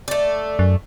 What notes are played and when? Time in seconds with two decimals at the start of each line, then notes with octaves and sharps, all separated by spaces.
0.08 A3 D5
0.59 F#2